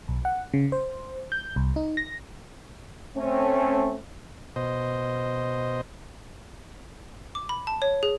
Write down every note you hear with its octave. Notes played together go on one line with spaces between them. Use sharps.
B1
F#5
C#3
C5
G6
C2
D#4
A#6
A3 C4 C#4
B2 C5 D#5
D6
B5
A5
C#5
G#4